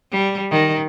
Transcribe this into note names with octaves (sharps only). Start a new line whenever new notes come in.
G3
D#3